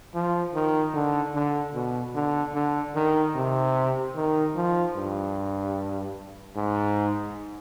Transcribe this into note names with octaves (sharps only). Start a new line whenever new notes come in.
F3
D#3
D3
D3
B2
D3
D3
D#3
C3
D#3
F3
G2
G#2